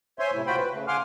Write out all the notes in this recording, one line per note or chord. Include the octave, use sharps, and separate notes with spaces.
C5 C#5 E5 G#5 C6
A2 C3 A3 E4
F4 F#4 C5 G5 B5
B4
C#3 A3
F5 F#5 G#5 C6 D6 F6